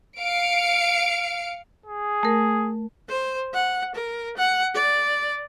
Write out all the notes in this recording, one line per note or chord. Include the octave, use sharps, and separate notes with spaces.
F5 C#7 D7
G#4
A3 A#4
C5
F#5
A#4
F#5
D5